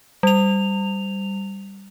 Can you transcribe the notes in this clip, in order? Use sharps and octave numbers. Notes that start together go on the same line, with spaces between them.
G3 F7